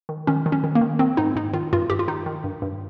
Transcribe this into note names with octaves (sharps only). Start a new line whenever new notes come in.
D#3
D#3 C#4
D#3
C#4
D#3
A#3
D#3
D#3 C4
G#2 D#4
G#2 D#4
D#3 F4
G2 F4
G2 G4
F4
D#3 D#4
D#3
G2
G2